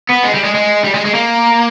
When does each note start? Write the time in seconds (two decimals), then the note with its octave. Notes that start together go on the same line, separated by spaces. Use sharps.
0.09 B3
0.23 G#3
0.34 G3
0.44 G#3
0.54 G#3
0.84 G3
0.94 G#3
1.05 G#3
1.14 A#3